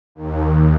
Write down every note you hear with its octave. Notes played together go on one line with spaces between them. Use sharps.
D#2